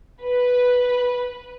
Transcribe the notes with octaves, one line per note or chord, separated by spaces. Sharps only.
B4